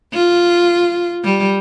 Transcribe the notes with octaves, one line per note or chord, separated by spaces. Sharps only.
F4
G3